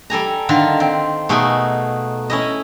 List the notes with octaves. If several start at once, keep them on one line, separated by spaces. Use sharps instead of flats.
G3 A4 G#5 A#5
D3 D#3 F4
C4
B2 A3 D#4 G#4 G#5 B5
C#4 E4 D#5